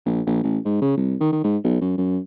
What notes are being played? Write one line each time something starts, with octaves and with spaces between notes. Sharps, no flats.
A#1
A#1
A1
G#2
C#3
C2
D#3
D#3
G#2
B1
F#2
F#2